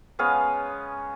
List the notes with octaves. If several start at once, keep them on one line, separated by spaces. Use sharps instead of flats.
G#3 B3 C#4 F5